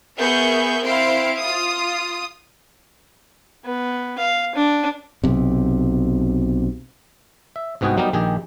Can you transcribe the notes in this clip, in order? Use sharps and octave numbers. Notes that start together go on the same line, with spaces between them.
B3 G#4 A#4 E5 C#6 G6
C4 E4 F5 C6 D7
F4 D#6
B3
F5
D4
B1 C3
E5
C2 G#2 B3 F#4 G#4 G5
F#3 G3 B3 D#4 G4 A#4
A#1 D#3 G4 G#4 G5